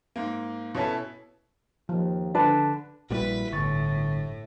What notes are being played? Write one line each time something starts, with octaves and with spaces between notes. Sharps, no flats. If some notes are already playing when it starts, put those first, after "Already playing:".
G#2 A#3
B2 C#4 E4 A4
D#2 F3
D3 D4 B4 A5
A#1 A#2 G3 E4 F#4 B4
G1 A2 D3 C#6 A6